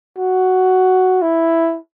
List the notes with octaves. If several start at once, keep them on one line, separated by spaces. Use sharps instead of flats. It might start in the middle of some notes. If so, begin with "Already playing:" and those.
F#4
E4